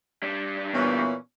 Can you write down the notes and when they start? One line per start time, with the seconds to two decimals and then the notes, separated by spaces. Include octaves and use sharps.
0.23 G3 D4
0.74 A#2 E3 B3 C#4